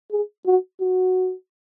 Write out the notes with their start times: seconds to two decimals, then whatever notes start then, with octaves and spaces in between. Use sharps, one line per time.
0.11 G#4
0.46 F#4
0.81 F#4